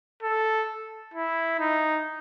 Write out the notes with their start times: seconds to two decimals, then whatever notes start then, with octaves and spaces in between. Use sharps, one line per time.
0.23 A4
1.14 E4
1.60 D#4